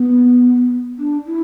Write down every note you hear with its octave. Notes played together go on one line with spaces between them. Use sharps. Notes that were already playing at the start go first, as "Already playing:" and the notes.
Already playing: B3
D4
E4